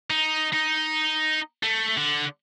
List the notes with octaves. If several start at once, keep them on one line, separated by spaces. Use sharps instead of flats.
D#4
D#4
A3
D3